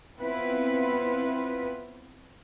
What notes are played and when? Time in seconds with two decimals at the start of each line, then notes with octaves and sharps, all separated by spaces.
0.17 B3 C4 E4 F4 B4